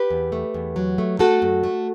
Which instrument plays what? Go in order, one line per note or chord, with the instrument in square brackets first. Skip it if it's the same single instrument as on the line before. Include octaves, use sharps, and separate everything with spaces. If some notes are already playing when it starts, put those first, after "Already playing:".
Already playing: [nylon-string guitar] G4 B4
E2
A3
E2
F#3
A3
A3 F#4 A4
F#2
A3